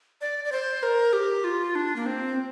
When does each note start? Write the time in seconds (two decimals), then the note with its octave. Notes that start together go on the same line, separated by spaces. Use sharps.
0.21 D5
0.44 D5
0.52 C5
0.83 A#4
1.13 G4
1.44 F4
1.75 D4
1.96 A#3
2.06 C4